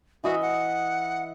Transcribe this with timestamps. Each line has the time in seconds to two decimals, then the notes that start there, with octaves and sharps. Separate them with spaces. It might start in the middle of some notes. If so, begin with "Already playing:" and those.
0.24 E3 F#4 D#5 E5
0.42 F#5